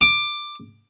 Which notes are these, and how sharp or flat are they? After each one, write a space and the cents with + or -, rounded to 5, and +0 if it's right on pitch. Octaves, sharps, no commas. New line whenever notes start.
D6 +10